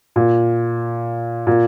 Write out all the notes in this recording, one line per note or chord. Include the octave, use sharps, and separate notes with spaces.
A#2
A#2